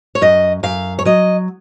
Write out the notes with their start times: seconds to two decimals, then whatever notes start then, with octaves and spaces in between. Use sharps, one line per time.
0.15 C#5
0.21 F#2 D#5
0.63 F#2 F5
0.99 C#5
1.05 F#3 D#5